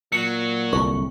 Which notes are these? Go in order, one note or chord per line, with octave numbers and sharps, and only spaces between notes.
A#2 F#3 F#4 C#7
D1 C2 A3 C#6